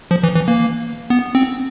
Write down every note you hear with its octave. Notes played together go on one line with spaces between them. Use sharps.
F3
E3
E3
A#3
B3
C4